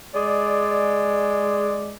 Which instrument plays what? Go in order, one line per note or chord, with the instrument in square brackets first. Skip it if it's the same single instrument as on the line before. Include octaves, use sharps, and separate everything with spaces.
[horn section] G#3 D5